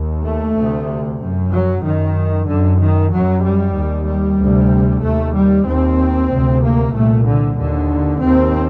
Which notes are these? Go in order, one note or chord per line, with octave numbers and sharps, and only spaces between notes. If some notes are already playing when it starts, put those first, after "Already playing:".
Already playing: D#2
A3
D2 C3
F#2
F#3
F#2 D#3
F#2 D3
D#3
F#2 F#3
G3
D#2
G3
D2 C3
D#2 A3
G3
D#2 C4
D2 C3
A#3
C2 A#2 A3
D3
D#2 D3
D#2 C4